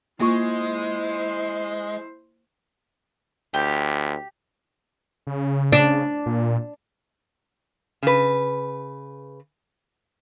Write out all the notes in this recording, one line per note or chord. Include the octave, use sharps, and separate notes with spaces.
G#3 A#3 E4 F4 C5 C#6
D2 G4
C#3
D4
A#2
C#3 B4